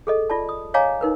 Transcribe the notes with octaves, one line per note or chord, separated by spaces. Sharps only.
G#4 A4 D#5
F4 D5 A5
D#6
C#5 D#5 F5 G#5 A#5 D6
D#4 A#4 B4